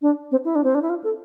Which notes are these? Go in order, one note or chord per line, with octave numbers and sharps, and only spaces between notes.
D4
C4
E4
D4
C4
D4
E4
F4
A4